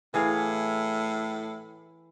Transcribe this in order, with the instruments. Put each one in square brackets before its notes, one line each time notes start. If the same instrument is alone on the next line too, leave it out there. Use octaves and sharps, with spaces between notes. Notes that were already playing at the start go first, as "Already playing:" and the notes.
[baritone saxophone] A2 [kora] E3 G#4 F5